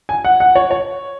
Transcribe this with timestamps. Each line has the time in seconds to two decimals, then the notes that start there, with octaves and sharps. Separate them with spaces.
0.09 G#5
0.25 F#5
0.40 F#5
0.55 C#5
0.71 C#5